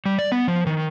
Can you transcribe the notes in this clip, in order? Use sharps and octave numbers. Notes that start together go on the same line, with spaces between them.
G3
D5
B3
F3
D#3